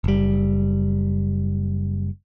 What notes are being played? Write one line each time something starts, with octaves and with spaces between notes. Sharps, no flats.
F#1 G3